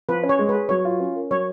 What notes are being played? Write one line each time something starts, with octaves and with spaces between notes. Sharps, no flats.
F3 B4
C#4
C#5
G#3
B4
G#4
F#3 C#5
F4
C#4
A#4
F#3 C#5